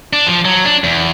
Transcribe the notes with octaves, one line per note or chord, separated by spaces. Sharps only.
D4
F3
F#3
D4
E2